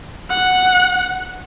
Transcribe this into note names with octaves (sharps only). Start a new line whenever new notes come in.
F#5